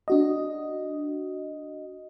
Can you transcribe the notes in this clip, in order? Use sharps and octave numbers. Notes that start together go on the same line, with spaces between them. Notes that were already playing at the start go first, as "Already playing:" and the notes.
D4 F#4 D#5